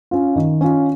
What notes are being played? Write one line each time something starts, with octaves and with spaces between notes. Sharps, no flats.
C#4 F4
D#3
C#4 F4